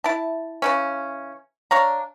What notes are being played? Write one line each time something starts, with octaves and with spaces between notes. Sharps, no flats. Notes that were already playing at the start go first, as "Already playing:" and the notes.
E4 A5
C#3 E3 C#4
D4 C#5 F5 A#5